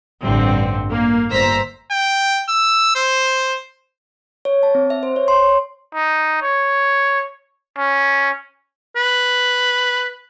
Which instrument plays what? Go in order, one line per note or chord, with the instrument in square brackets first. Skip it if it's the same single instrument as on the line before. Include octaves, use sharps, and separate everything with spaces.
[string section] A1 G2 D3 C4
A#3
G1 C5 A#5 E6 B6
[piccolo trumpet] G5
E6
C5
[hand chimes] C#5
A5
C4
E5
C5
C#5
C6
C#5
[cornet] D#4
C#5
C#4
[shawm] B4